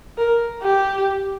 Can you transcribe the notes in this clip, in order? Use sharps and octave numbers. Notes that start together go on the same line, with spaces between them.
A#4
G4